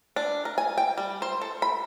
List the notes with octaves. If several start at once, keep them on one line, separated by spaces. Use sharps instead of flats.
D4
A#4
G#5
G5
G3
C5
A4
B5